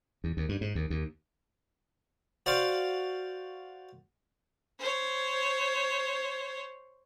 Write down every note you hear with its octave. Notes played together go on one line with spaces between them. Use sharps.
E2
D#2
G2
G#2
D#2
D#2
F#4 C5 D5 F5
C5 C#5